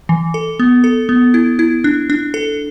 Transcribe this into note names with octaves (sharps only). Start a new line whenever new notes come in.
E3
A4
B3
A4
B3
E4
E4
D4
D4
A4